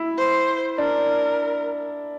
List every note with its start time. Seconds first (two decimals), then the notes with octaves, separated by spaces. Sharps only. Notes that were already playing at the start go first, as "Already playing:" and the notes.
Already playing: E4
0.18 C5
0.78 D4 A#4